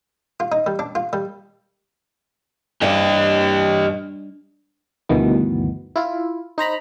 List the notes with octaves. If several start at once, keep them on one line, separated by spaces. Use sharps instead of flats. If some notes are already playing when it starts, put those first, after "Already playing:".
F4
D#4
G3
D4
F4
G3
G2 G4 D#5
D2 G2 B2 D#3 E3 B3
E4 F4
D#4 C5 A#5 B5